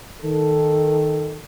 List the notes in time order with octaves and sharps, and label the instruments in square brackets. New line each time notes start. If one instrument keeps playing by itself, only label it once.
[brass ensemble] D#3 A4